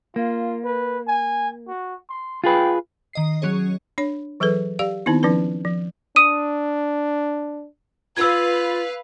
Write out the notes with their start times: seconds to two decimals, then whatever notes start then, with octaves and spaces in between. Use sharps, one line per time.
0.16 A#3 F4
0.65 B4
1.07 G#5
1.68 F#4
2.10 C6
2.44 F4 G#4 B4 G5
3.13 D#3 D#5 C7
3.42 F#3 C#4 G#4 C#5
3.98 D4 C#5
4.40 E3 F#3 G#4 A4 B4
4.79 G4 D5 F5
5.06 D#3 B3 C4 D#4 E4
5.23 F3 C#4 D#4 B4
5.65 F3
6.16 D4 D#6 D#7
8.17 F4 B4 F5 E6 G#6